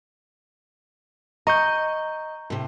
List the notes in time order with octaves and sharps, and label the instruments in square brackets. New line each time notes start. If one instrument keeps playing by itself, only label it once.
[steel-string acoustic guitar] D#5 [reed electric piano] A#5 C#6 G6
[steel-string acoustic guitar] A2 C3